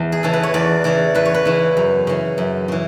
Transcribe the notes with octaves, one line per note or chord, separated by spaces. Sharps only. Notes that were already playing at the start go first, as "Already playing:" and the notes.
Already playing: E2
G#4
C#3 E3 A4
B4
C#5
E2 D5
C#3 E3 D5
E2 B4
C#5
B4
C#3 E3
F#2
C#3 E3
F#2
C#3 E3